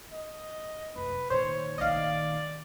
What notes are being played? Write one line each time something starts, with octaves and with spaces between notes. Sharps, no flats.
D#5
F1 F#2 B4
A#2 D#3 C5 C#5
A#1 D#3 D5 D#5 F5